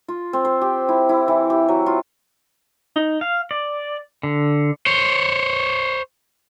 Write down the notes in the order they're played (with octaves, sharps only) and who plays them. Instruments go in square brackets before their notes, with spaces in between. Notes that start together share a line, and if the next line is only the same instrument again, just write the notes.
[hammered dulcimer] F4
C4
C5
G4
E4
E4
E3
G4
F#3
F4
[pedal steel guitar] D#4
F5
D5
D3
[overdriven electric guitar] C5 C#5